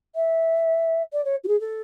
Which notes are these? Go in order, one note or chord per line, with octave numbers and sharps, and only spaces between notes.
E5
D5
C#5
F#4
G#4
A4